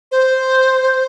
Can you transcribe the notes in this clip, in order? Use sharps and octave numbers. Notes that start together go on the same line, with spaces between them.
C5